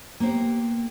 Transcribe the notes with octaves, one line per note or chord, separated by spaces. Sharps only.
A#3 B3 G4 C5